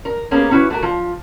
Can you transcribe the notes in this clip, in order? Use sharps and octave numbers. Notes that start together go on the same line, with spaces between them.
A#4
A#3 B3 C#4 G4 G#4 A#4
C#4 E4 F#4 B4
A3 F#4 A#4
F3